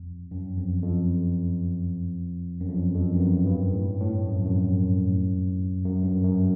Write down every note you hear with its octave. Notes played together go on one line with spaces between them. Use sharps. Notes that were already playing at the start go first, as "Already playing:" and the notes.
Already playing: F2
F#2
F2
F2
F#2
F2
F2
G2
F#2
G2
A2
A2
F#2
F2
F#2
F#2
G2
F#2